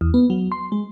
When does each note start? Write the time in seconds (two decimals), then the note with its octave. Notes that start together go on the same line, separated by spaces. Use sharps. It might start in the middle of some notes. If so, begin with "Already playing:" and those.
0.01 E2
0.14 B3
0.30 F#3
0.52 C6
0.72 G#3